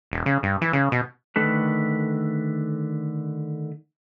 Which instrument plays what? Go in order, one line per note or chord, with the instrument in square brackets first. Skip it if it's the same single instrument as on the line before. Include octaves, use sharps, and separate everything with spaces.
[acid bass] E1
C#3
G2
E3
C#3
B2
[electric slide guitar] D3 D#3 A3 B4